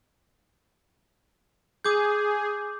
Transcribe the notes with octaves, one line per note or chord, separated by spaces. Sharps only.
G#4 D6 G6